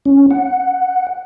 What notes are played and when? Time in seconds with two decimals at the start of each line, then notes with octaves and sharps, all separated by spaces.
0.06 C#4
0.31 F#5